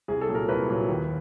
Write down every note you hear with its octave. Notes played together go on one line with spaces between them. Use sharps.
C2 G#4
A4
A#2 F#3
A#4
C2 B4
A#2 F#3
D#2